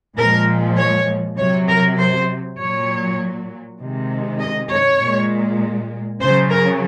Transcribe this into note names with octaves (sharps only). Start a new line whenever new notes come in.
A#2 F3 G#3 A#4
C#5
C3 F#3 C#5
A#4
C5
A#2 F#3 C#5
C3 D#3 G#3
D#5
C#5
A#2 G#3
C#3 F#3 C5
A#4